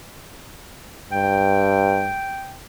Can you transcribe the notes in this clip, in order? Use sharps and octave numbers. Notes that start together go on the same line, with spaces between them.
G2 G5